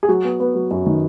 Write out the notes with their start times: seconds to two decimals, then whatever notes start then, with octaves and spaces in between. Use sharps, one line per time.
0.03 G#4
0.08 F#3 F#4
0.24 B3
0.40 B3
0.55 F#3
0.71 F#2
0.86 D#3